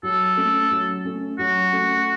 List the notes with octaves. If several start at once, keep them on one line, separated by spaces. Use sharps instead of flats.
F#3 A4
A3 C#4
F#3
A3 C#4
F#3 F#4
A3 C#4